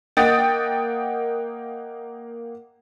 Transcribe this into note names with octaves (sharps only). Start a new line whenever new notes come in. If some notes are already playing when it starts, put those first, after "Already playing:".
A#3 D#5 F#5 G5 D#6 A6